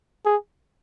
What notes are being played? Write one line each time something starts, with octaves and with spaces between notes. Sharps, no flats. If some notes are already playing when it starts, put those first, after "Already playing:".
G#4